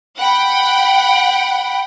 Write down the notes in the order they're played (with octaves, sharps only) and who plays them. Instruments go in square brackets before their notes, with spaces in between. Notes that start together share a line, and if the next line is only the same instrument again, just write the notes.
[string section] F#5 G5 B5